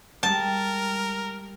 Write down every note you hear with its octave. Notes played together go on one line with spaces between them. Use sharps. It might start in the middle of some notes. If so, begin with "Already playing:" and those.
G3 G#3 A#4 A5